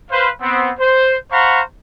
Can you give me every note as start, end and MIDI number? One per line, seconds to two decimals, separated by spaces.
0.11 0.30 71
0.11 0.30 72
0.11 0.30 77
0.41 0.71 59
0.41 0.71 60
0.79 1.16 72
1.31 1.61 72
1.31 1.61 77
1.31 1.61 78
1.31 1.61 82
1.31 1.61 83
1.31 1.61 85